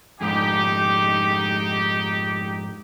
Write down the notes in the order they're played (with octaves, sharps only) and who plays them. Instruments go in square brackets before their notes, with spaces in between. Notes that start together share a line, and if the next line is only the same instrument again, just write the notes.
[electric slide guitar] F2 G#2 [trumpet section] D#4 G4